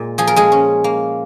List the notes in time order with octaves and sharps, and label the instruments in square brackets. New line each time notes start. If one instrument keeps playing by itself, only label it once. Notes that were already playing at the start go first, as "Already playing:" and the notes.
Already playing: [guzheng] A#2 G#3
F3 G#4
A#4
G#3 G#4
C#4
A#3